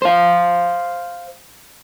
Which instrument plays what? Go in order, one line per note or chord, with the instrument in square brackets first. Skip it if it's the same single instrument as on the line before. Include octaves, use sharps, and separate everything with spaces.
[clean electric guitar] C5 F5